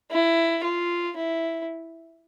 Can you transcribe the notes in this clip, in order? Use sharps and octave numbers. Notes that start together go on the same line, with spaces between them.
E4
F4
E4